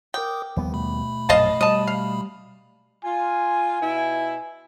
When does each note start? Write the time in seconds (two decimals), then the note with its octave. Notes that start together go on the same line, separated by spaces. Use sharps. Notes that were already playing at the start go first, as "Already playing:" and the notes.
0.14 A#4 G5 D6 D#6
0.57 D#2 F3 G3 B3
0.74 B2 A3 B5
1.29 A#1 F#2 D#5 F5 A5
1.61 G3 D#5 A5
1.87 F5
3.04 F4 G#5
3.80 B2 E4